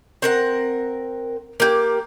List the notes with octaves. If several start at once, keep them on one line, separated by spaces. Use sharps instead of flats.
C4 A#4 F#5
A#3 G4